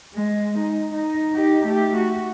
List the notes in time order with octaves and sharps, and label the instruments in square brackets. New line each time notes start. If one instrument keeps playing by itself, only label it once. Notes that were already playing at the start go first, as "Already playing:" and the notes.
[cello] G#3
D#4
D#4
D#4 G4
A3 G4
F#4